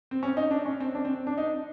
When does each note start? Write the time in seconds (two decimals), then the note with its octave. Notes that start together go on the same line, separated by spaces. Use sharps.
0.11 C4
0.23 C#4
0.37 D#4
0.51 D4
0.66 C#4
0.80 C4
0.95 D4
1.05 C4
1.27 D4
1.38 D#4